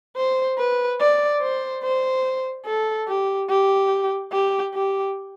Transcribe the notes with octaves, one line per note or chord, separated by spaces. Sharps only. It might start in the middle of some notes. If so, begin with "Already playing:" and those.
C5
B4
D5
C5
C5
A4
G4
G4
G4
G4